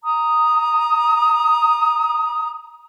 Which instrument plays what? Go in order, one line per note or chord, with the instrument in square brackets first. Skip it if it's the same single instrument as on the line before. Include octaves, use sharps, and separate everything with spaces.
[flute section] A#5 D#6